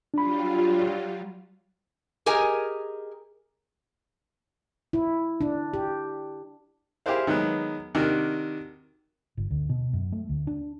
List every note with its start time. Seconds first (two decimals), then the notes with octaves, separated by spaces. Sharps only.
0.14 F#3 G3 D4 F4 B5
2.26 G4 G#4 A#4 D#5 G#5
4.93 E4
5.41 D4
5.74 G4
7.06 E4 G4 G#4 A#4 C5 F5
7.27 D#3 F#3 G#3 B3
7.95 C3 D#3 D4 F#4 A#4
9.37 G1
9.51 D2
9.69 B2
9.93 F#2
10.12 A3
10.29 D2
10.47 D4